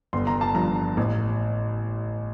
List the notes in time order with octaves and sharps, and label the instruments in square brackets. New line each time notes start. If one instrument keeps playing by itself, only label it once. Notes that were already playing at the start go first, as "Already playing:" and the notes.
[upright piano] G1 C6
A#5
A5
G2 F3 A#5
A1